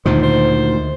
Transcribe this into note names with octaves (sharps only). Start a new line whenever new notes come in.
D2 A#2 D#3 C5
C5